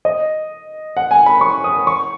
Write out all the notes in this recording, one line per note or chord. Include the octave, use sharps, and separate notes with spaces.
D#5
F#5
G#5
B5
C#6
D#6
C#6